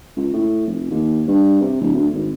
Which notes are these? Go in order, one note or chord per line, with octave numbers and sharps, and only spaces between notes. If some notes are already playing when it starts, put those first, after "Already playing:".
C#2
A2
F1
D#2
G2
C3
D1
D2
G#1